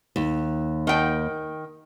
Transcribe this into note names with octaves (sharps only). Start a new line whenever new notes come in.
D#2
D#3 G5